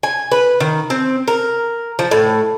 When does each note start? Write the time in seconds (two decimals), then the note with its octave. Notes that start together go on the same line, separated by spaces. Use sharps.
0.03 G#5
0.32 B4
0.60 D#3
0.90 C4
1.28 A#4
1.99 F3
2.11 A2